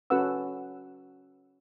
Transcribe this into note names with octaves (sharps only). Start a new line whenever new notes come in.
C#4 F#4 A4 B4 F#5 E6